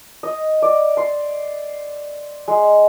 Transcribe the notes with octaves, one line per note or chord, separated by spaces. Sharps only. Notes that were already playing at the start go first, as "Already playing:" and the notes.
D#5
D5
C6
G#3